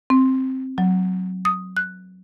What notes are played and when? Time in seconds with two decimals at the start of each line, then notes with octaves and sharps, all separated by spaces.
0.10 C4
0.78 F#3
1.45 D#6
1.77 F#6